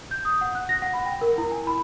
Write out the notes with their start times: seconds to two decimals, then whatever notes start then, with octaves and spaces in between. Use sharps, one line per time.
0.11 G6
0.25 D#6
0.41 F#5
0.55 F#6
0.69 A#6
0.82 F#5
0.93 B5
1.06 G5
1.21 A#4
1.38 E4
1.52 G#5
1.67 B5